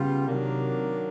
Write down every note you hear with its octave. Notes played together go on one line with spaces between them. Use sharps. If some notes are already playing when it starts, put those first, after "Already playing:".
Already playing: C#3 G3 B3 F4
C3 D#3 F#3 A#3 D4